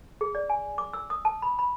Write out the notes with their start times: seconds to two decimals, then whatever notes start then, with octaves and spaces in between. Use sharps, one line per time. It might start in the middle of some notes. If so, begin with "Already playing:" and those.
0.21 G#4
0.35 D5
0.50 G#5
0.78 D6
0.93 E6
1.10 D#6
1.25 A5
1.42 B5
1.59 B5